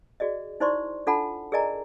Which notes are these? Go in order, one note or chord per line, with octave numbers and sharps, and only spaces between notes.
F#4 G#4 D5 D#5
D#4 E4 C5 D5 C6 C#6
D4 F4 A4 F#5 A5 B5
G#4 A#4 D5 D#5 G#5 A#5